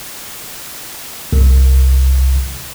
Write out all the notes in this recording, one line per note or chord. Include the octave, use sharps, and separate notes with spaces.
C2